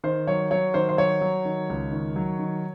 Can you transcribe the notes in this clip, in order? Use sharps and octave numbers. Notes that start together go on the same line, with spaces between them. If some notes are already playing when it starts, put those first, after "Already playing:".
D#3 C5
F#3 C#5
F#3 C#5
D#3 C5
C5
F#3 C#5
F#3
D#3
C#2
D#3
F#3
D#3